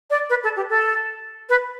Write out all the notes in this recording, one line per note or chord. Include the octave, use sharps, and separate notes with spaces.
D5
B4
A4
G4
A4
B4